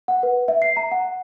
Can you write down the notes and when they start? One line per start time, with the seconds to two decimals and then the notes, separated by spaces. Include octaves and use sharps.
0.08 F#5
0.23 B4
0.48 E5
0.62 C7
0.77 A#5
0.92 F#5